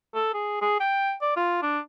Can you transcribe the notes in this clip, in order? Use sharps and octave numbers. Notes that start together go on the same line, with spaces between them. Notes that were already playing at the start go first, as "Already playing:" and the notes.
A4
G#4
G#4
G5
D5
F4
D4